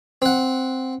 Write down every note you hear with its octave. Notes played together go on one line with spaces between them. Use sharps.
C4 F#5